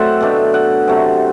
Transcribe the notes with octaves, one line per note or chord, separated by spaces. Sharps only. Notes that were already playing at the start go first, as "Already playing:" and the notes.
Already playing: A2 F#3 C4 C5 D5 E5 F#5
B2 A3 D4
F#5
C3 F#3 A3